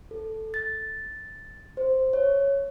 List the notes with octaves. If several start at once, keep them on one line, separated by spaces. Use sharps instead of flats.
A4
A6
C5
C#5